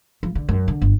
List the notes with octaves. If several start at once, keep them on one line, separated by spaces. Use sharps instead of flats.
F3
D3
F#2
D3
G1